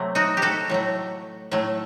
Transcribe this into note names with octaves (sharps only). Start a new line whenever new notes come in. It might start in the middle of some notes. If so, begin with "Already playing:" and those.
Already playing: C3 F#3 A3 C4
D#4 F#4
G4
F#4 A4
A2 F#3 A3
A2 F#3 A3